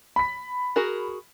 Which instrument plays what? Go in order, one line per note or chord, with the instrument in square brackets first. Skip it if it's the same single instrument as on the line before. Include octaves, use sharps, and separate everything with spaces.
[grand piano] B5 B6
[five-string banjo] F#4 G#4 A#4